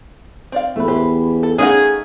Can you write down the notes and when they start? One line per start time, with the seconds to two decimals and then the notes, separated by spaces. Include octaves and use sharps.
0.52 C4 D5 F5
0.76 E2 A3 B4
0.88 G4 B4 C5
1.43 A4
1.58 A3 C#4 D#4 G#4 A#4 F5 F#5